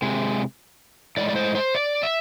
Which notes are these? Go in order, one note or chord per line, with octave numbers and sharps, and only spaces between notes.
C3 G#3
A2 G#3 D5
D5
C5
C5
D5
E5